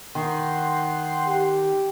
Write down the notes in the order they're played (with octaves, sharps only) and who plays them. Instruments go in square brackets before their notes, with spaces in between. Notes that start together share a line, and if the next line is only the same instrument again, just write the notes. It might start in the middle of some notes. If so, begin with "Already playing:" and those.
[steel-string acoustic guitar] D#3 [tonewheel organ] F#5 G5 C6
[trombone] G4